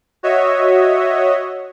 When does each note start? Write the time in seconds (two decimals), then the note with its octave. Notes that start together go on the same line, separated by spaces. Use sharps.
0.23 F#4 C#5 D#5 E5